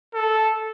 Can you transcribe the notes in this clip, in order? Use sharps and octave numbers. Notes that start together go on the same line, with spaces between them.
A4